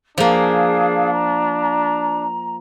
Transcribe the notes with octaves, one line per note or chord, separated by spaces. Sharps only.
F3 A#3 D4 G#4 F5
A#5